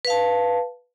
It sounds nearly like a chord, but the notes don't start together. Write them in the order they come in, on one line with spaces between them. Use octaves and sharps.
B4 F5 A5